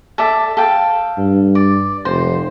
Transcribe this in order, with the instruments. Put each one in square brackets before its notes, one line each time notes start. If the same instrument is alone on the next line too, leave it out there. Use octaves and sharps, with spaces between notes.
[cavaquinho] A4 D5 E5
A4 F5 G5
[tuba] G2
[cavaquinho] D5
[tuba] F1 [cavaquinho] C5